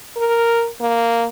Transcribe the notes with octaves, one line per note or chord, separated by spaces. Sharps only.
A#4
A#3